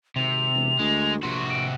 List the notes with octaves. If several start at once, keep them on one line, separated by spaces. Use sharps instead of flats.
G#1 C3 F7
E1
D2 G#3
A#1 C3 F#4 C6
D7